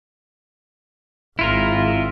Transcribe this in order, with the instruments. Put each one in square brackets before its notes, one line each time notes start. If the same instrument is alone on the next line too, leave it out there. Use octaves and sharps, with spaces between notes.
[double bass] G#1 [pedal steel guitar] E4 F4 A#4